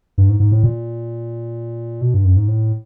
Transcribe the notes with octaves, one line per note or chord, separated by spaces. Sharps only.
G2
G#2
G#2
A2
A#2
B2
G2
F#2
G#2
A2